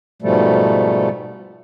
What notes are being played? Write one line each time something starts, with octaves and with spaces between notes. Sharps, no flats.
G#2 B2 F3 G3 A3